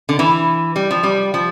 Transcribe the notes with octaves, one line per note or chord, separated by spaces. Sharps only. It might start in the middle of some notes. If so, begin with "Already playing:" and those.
D3
E3
G3
F3
G3
F3